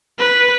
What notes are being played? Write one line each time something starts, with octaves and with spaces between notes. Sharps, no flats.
B4